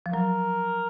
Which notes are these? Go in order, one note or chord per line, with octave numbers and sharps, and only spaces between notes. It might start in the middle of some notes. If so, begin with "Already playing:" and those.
F3
F#3 A#4